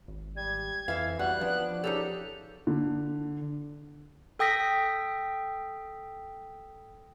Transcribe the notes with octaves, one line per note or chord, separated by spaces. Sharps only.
G#1
G3 G#6
F2 E3 E5 F5
G3 B3 F#4 F#6
F3 B3 D4
C#3 D#4 G4 A4 F7
D3
A4 G5 D#6 A#6 B6